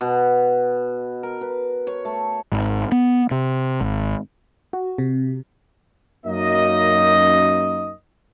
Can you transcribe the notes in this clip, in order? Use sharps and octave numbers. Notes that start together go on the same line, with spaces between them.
B2
A#4
B4
C#5
A3
G#1
B3
C3
G#1
F#4
C3
F#2 A#3 D#4 D#5